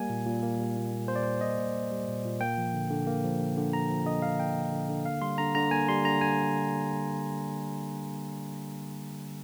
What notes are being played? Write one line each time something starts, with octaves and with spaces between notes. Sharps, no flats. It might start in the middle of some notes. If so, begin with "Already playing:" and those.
Already playing: G3 A#3 G#5
A#2
A#2
A#3
G3
A#2
A#2
A#3 C5
D5
G3 C5
A#2 D#5
A#2
A#3
G3
A#2
A#2
A#3 G5
F3
D3
D3
A#3
F3
D3
D3
A#3 A#5
F3
D3 D#5
D3 F5
A#3 G5
F3
D3
D3
A#3 F5
G3 C6
D3 A#5
D3 A#5
A#3 G#5
G3 C6
D3 A#5
D3 G#5